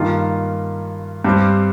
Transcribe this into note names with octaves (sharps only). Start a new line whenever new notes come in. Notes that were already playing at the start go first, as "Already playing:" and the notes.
Already playing: G2 D#3 A#3 F4
G2 G3 C4